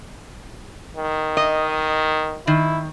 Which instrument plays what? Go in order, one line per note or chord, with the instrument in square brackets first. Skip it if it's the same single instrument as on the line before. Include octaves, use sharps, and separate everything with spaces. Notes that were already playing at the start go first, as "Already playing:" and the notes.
[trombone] D#3
[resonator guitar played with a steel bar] D#5
[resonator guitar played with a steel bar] D#3 [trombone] E4